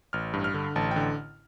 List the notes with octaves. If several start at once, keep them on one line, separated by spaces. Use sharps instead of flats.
A1 F6
G2
F6
D3
A1 A5
D3 G5